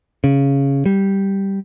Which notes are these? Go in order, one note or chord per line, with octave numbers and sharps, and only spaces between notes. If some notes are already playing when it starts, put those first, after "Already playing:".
C#3
G3